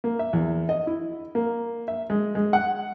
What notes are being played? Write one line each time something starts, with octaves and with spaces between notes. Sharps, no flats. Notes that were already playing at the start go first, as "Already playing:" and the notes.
A#3
E5
E2
D#5
E4
A#3
E5
G#3
G#3
F#5